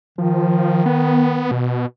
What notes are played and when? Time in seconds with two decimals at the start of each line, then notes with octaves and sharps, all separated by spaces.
0.18 D#3 F3
0.86 B3
1.51 B2